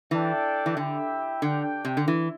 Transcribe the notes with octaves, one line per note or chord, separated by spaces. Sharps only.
E3 D4 A4 D5 G5
E3
D3 E4 G4 E5 G5
D3 D4 G4 D5 G5
C3
D3
E3